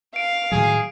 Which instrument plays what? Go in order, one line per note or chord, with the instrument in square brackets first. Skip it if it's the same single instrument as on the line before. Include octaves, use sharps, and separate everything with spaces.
[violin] F5 [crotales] D7
[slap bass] A2 D#3 F#3 [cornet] G#4